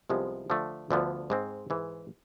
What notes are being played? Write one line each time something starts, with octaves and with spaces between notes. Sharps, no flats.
C2 C3 F3 G#3 B3
D3 F3 A3
D2 D3 F3 B3
G#2 G#3 C4
G#2 E3 G#3